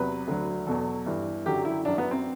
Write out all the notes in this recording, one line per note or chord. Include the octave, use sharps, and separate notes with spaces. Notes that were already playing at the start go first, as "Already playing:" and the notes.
Already playing: E2 C3 F#3 B4
D2 D3 F#3
E2 B2 F#3 A4
G2 E3
F#2 D3 F#3 G4
E4
F#2 F#3 D4
B3
C4